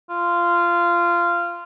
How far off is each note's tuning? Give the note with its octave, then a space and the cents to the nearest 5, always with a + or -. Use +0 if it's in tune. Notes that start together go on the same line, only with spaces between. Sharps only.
F4 -15